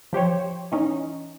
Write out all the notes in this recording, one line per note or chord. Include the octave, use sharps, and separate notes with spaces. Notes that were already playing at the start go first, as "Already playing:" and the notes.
F3 G4 C5 C#5
E3 C#4 D#4